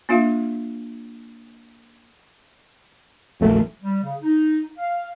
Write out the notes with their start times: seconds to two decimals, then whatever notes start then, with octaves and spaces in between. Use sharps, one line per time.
0.09 A#3 D4 F4 E5 F5
3.41 D#1 A#1 F2 F#3 A3 A#4
3.82 G3
4.02 C#3
4.21 D#4
4.78 F5